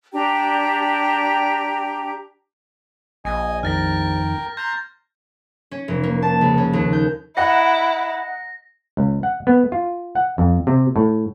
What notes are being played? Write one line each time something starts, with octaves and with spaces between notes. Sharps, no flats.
D4 G4 G5 A#5
A#1 D#5 G#5
F2 D#3 A#4 G5 F6 A6 A#6
A#5 C6 G6
C#4
F1
A#3
A5
C#2
C#4
D#2
G6
E4 D#5 F#5 A#5 A#6
C#2
F#5
B3
F4
F#5
F2
C3
A2